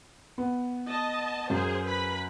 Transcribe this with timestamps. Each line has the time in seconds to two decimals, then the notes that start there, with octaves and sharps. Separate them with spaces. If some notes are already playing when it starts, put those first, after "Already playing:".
0.38 B3
0.87 D#5 A5
1.50 F#2 G#4 C5
1.86 B4 B5